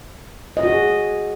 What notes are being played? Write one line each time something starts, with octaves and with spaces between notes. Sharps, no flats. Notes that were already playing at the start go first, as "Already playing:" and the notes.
D#5
F#4
G#4